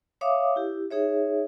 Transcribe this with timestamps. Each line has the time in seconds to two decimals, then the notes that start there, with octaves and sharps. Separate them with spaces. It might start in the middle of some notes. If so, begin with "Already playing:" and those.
0.21 C#5 E5 F5 D6 D#6
0.56 E4 G4
0.90 D#4 G#4 C#5 E5